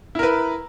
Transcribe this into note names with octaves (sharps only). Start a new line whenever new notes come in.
E4 A#4 B4